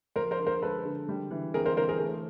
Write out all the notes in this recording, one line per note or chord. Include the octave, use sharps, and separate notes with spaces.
F3 A#4 C5
A#4 C5
D3
A#4 C5
G#3 A4 B4
D3
G3
E3
C4 G#4 A#4
A#4 C5
E3 A#4 C5
G#4 A#4
A3